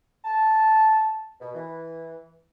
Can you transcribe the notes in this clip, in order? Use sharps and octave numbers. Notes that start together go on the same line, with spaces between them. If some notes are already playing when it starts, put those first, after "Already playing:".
A5
B2
E3